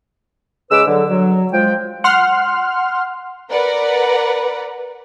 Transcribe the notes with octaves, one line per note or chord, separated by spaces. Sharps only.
C#3 G#3 B4 D6 E6
D3 F#3
F#3
F3 G#3 G5
F#5 C6 F6
A#4 B4 D5 F#5 A#5